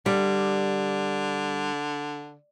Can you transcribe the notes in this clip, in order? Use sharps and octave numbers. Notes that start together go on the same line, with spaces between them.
D3 G3